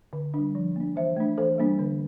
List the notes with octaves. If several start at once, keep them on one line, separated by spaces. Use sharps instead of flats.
D3
G3 D4
F3
A#3 D4
E3 C5 E5
A3 D4
E3 A4 C5
G3 A#3 D4
D3